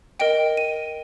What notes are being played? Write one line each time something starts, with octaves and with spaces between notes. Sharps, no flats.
A#4 D#5 G5 D7
D#7